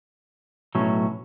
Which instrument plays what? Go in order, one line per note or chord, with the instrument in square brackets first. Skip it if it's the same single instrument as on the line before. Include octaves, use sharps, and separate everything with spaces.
[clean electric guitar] B1 A2 F#3 A3 C#4